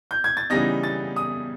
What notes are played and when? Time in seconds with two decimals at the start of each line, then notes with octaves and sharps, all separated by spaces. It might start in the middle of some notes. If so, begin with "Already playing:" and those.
0.11 G6
0.24 G#6
0.37 A6
0.50 C#3 E3 G3 B3 D#4 A#6
0.83 A6
1.16 D#6